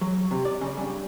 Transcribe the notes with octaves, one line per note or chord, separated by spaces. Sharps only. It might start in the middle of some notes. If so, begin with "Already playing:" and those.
F#3
C3
D5
C#3
G2